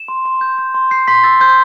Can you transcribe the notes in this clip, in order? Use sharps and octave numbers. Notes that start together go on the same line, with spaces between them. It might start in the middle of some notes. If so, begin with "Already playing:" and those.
Already playing: E7
C6
C6
G6
G6
C6
G6 C7
C6 B6
E6 A6
C6 G6